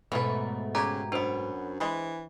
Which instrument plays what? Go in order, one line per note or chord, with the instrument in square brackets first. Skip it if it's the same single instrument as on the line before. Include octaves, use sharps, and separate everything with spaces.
[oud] G#2 B2 A3 [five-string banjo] E3 C#4 B4
[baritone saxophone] C#3 [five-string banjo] G4 [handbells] A#5 G#6
[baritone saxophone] F#2 [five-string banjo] B3 C#4 [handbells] D4 C5
[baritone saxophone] E3 [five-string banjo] G#3 B4